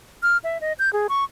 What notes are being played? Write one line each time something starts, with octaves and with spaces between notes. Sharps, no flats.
F6
E5
D#5
G6
G#4
C#6